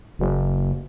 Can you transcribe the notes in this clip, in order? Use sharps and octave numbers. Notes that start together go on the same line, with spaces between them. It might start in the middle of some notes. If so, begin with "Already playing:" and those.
F#1